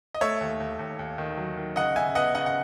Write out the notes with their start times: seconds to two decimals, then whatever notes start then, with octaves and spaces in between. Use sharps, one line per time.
0.14 D#5
0.21 A3 C#5 E5
0.41 D#2
0.60 D#2
0.79 D#2
0.99 D#2
1.18 D#3
1.37 F#3
1.57 D#3
1.76 C#3 D#5 F#5
1.96 C#3 E5 G#5
2.15 B3 D#5 F#5
2.35 C#3 D#5 F#5
2.46 F#5